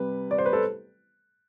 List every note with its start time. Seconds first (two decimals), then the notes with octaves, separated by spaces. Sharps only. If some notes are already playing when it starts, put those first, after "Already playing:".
Already playing: C3 G3 B4
0.31 D5
0.38 C5
0.46 B4
0.53 A4